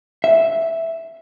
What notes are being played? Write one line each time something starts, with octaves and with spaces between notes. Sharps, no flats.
E5